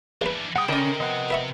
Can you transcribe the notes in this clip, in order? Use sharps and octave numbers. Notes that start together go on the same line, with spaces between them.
A#1 E3 D4 B4
C3 G3 F#5 G5 D#6
C#3 C#4 D4 A#4 D5 D#5
F3 B3 D#5 F#5
B4 E5 C#6